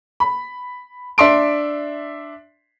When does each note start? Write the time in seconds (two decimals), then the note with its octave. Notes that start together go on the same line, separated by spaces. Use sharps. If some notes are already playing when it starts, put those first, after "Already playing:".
0.20 B5
1.18 D4 E5 C6 D7